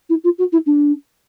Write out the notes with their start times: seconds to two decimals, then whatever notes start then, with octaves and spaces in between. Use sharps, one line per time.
0.10 E4
0.24 F4
0.39 F#4
0.52 E4
0.66 D4